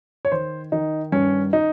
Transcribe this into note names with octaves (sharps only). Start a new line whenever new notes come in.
C#5
D#3 C5
D#3 D#4
G2 C#4
D#4